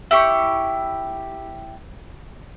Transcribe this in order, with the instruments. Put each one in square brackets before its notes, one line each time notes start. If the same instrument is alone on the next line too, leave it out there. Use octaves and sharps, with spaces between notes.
[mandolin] E4 G4 C#6